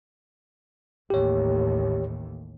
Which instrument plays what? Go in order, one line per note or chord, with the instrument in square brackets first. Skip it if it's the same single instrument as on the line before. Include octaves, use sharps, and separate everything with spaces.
[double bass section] A1 D#2 [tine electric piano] G4 C#5